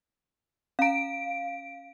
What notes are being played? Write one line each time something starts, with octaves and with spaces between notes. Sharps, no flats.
C#4 F5 A#5 D7